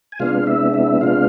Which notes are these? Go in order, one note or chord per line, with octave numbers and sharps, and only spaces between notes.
G#5
C3 G#3 B3 D4 F4 F5
E4 E5
E4 E5
C3 G#3 B3 D4 F4 F5